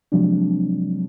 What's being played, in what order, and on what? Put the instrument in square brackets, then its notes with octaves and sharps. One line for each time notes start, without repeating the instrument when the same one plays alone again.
[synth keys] C3 F3 F#3 G#3 C4 D4